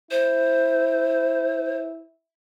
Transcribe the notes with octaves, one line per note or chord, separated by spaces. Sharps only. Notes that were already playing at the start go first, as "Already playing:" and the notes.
E4 C5